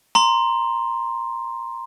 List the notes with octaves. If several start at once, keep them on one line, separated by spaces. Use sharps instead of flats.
A#5 C6